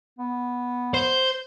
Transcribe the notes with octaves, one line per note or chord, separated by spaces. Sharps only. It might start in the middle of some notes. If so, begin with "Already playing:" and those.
B3
C5